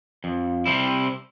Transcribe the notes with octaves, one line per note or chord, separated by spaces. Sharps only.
F2
C3 G3 C4 E4